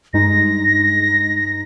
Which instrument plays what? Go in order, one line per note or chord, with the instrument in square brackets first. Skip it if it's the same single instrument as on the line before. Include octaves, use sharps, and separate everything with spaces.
[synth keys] G2 G#3 D#4 [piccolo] A#6